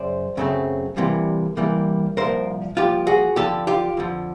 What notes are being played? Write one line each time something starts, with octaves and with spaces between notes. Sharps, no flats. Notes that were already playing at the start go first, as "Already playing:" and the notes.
Already playing: F#2 C#3 C5 D5
F#2 C#3 F#3 A3 C4
C2 C3 E3 G3 A#3
C2 C3 E3 G3 A#3
C2 A#2 F3 A#4 C5
C2 A#2 F3 F4 G4
F#4 G#4
F2 D3 F3 G4 A4
F4 G4
F2 D3 F3